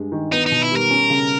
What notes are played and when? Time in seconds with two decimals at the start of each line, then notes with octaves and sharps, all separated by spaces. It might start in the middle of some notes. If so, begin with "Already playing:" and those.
Already playing: G2 G#3
0.12 D#3
0.32 B3 D#4
0.46 D#4
0.51 B2
0.62 E4
0.71 G3
0.77 A#4
0.90 C#4
1.10 C#3